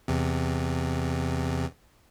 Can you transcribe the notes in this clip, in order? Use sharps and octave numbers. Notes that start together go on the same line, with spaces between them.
E2 C3